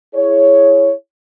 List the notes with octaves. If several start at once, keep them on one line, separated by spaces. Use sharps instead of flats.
E4 G#4 C#5